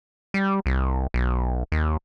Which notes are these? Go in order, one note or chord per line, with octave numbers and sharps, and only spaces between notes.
G3
C2
B1
D#2